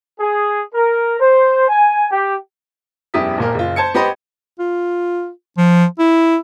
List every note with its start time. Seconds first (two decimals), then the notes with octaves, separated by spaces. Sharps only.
0.20 G#4
0.74 A#4
1.20 C5
1.68 G#5
2.11 G4
3.14 E1 F#2 E4 G4 D#6 B6
3.38 D#1 A#2 A#4
3.55 F#1 F4
3.76 C5 A5 G#6 C#7
3.94 B3 G4 C5 D#5 B5
4.59 F4
5.58 F3
5.99 E4